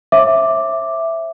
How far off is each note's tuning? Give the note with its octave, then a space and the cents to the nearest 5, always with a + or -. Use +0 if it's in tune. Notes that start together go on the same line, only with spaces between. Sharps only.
C#5 -45 E5 +0 D6 +0